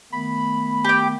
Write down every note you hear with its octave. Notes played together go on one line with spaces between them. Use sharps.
D#3 A3 B3 B5
G4 G5